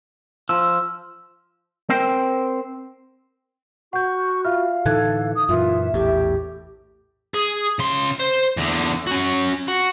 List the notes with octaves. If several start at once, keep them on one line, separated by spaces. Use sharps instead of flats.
F3 E6
C4 A#4 C5 G5
F#4 F#5 C#6 G6
F4 E5 F5 F6
A2 D3 E3 D#4 A4 F#6 G#6
D#6
F#2 A#2 E3 F4 E5
A#1 E2 A2 G4
G#4
C#3 C6
C5
E2 D3
C#4 F#4
F#4